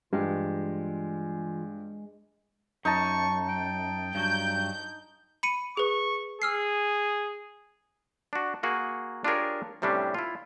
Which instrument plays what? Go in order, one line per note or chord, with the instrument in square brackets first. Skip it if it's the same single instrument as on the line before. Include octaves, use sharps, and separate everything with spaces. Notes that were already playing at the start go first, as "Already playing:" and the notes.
[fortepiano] G2 [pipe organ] E3 F4 [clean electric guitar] G#3
[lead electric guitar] F#2 [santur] D#4 A5 [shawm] C#6
[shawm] G5
[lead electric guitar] G2 F#3 [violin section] G6
[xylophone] B5 C#7 D#7
[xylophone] G#4 B4 [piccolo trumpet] C#6
[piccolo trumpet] G#4 [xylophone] E6 F6 C7
[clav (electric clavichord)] D4 F#4
A#3 F#4 G#4
D4 F4 G4 G#4 A#4 C#5
A2 C3 G3 C#4 D4
E4 F4